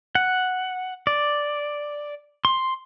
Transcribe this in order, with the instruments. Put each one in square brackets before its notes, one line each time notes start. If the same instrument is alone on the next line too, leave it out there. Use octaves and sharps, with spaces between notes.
[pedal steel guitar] F#5
D5
C6